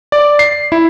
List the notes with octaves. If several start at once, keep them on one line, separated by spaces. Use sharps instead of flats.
D5
C7
E4